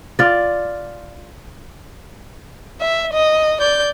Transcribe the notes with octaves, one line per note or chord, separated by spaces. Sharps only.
F4 D5
E5
D#5
D5 G6